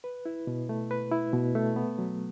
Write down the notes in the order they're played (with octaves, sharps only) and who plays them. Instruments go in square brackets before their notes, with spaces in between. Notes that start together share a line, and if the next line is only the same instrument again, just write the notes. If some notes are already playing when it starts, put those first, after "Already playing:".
[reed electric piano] B4
E4
B2
A3
B4
E4
B2
A3
B3
F#3